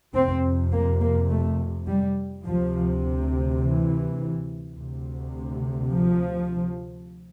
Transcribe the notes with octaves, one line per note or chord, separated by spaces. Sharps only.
F2 C3 C4
A#3
A#3
A3
G3
D2 C3 F3
E3
D2 C3
F3